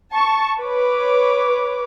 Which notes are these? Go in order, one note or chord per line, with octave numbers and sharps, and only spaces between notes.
A5 C#6
B4 C#5 D6